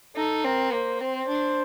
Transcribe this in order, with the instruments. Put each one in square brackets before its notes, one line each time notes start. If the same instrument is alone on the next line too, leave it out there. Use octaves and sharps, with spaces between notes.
[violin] D#4 [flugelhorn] A4
[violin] C4 [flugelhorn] A#4
[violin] A#3 [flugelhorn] C5
[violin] C4 [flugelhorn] C5
[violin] D4